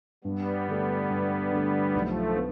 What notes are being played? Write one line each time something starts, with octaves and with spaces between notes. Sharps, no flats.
G2 G3 B3
D3 A3
G2
D3 A3
B1 F3 A3
B3